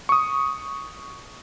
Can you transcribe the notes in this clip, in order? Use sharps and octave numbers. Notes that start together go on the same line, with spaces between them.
C#6 D#6